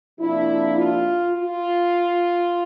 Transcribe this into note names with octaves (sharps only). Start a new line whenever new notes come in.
C3 F3 A#3 D4 E4
F4
F4